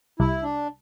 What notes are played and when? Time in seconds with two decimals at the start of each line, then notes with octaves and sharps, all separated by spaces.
0.19 C2 E4
0.43 D4